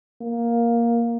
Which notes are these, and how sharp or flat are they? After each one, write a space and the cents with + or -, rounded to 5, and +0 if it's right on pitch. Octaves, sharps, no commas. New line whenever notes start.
A#3 +5